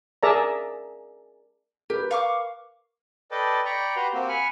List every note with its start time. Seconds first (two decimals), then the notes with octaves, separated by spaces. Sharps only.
0.23 G#4 A#4 D5 E5 A5 A#5
1.90 G4 A#4 B4
2.11 F5 C#6 D6
3.31 A4 B4 D5 D#5 G5 A5
3.65 D5 G5 A#5 B5 C#6
3.96 F#4 G4 B4 A#5 C6
4.14 A#3 C4 F#4 G4
4.29 F#5 G#5 B5 F6